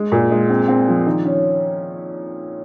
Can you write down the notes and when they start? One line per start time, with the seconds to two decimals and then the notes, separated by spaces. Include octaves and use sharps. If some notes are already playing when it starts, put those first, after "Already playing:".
Already playing: G#3
0.12 A#2
0.31 G#3
0.50 C4
0.68 C4
0.88 F3
1.06 D#3
1.25 C#4